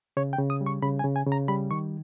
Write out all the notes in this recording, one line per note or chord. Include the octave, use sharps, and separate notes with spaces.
C#3 C#5
G5
C#3
D#6
G3
C#6
C#3 B5
G#5
C#3
G#5
C#3
A#5
G3 B5
D#3 C#6